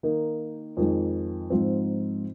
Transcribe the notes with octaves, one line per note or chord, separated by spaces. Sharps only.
D#3 A#3 D#4
F2 D#3 G#3
G#2 F3 C4